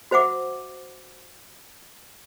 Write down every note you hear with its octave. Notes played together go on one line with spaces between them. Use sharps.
F#4 C5 E5 F#5 D6